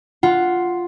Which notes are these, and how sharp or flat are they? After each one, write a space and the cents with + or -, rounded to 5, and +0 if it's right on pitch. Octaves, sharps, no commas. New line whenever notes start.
F4 +0 F#5 +0